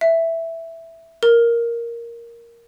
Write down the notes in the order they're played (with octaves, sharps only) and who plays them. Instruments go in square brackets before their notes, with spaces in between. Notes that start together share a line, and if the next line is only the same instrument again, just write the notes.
[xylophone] E5
A#4